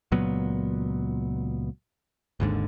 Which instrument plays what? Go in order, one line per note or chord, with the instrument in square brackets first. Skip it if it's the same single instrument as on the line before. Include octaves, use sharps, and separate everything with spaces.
[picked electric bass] C#2 A#2 F#3 B3
G#1 D#2 G#2 D3